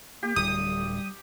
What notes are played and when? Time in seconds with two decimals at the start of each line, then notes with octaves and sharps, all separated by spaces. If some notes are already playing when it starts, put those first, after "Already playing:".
0.23 A#3 G4
0.36 D1 D2 A2 G3 D#6